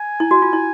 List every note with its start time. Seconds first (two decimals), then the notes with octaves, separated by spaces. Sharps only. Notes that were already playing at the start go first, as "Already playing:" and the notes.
Already playing: G#5
0.20 E4
0.31 F#4
0.42 F4
0.53 E4